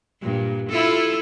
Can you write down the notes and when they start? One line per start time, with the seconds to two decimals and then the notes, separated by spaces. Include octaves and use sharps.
0.21 G2 A#2
0.69 E4 F4 A4